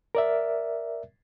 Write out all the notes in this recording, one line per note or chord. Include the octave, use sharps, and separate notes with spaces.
A#4 D5 E5